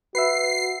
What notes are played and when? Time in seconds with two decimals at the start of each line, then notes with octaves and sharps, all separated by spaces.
0.15 F#4 B4 E5 C7